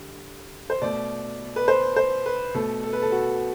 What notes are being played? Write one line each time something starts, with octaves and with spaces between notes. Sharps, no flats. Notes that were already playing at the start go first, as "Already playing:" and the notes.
Already playing: D3 G3
C5
B2 A3 D5
B4
C5
C5
B4
B2 A3 A4
A4
B4
A4
F#4